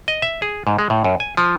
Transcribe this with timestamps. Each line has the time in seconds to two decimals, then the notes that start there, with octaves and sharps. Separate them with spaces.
0.08 D#5
0.22 E5
0.42 G#4
0.67 G#2
0.79 G#3
0.90 A2
1.04 F#2
1.20 G#5
1.37 F3